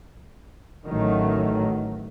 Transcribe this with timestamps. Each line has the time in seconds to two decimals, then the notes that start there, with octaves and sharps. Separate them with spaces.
0.86 A1 D#3 F#3 A3